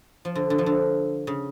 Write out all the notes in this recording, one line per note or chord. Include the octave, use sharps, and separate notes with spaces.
F3
D3
D3
F3
D3
C#3